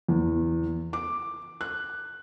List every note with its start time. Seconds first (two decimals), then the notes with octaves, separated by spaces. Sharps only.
0.08 E2
0.93 D6
1.61 F#6